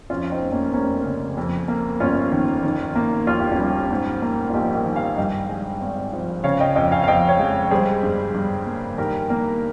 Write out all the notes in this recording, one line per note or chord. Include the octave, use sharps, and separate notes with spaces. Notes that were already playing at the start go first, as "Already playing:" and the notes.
F2 C#4 F4
C4 D#4
F1
A#3 C#4
F1 A#3 C#4
C#3
F2
A#3
G1 C#4 F4
D#3
D#3
A#3
D#2 F4
G4
C#4 F4
G3
G#2
A#3
F4
A#1 D#4 G4
G4 A#4
D#3
F5 G#5
G2 D#5 G5
G#3
G#1
F3
C#3 C#5 F5
D#5 G5
F2 D#5 G5
F5 G#5
F5
F2 D#5 G5
C#5 F5
G#3
G3 G#4 C5
G2
G2
A#3
D#3 G4 A#4
A#3